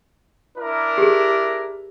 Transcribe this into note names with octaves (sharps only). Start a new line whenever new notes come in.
D4 E4 A#4
G4 G#4